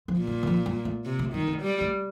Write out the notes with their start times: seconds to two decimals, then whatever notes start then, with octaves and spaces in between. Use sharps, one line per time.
0.08 F3
0.19 A#2
0.27 G3
0.43 D#3
0.47 F3
0.66 G3
0.85 A3
1.05 C3
1.19 A3
1.33 D#3 G3
1.48 A3
1.62 G3
1.81 A3